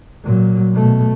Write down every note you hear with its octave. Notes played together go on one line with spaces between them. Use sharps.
A#2 F#3
B2 A3